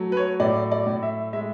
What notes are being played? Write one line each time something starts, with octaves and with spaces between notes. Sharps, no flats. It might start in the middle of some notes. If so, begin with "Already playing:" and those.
Already playing: F#3 A3
B4
C#5
A2 D5
D5
A2
E5
G#3 E5